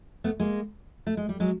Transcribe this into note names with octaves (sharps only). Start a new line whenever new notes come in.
A3 B3
G#3 A#3
A3
G#3
G3
F#3 G#3